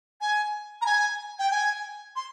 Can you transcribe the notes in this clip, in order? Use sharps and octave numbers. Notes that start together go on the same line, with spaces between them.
G#5
A#5
G#5
G5
G#5
C6